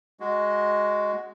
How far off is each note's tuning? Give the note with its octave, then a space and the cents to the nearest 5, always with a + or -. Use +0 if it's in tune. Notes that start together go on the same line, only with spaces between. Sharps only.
G#3 +0 F#4 +0